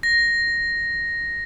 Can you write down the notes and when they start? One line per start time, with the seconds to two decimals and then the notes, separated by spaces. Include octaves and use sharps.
0.03 A#6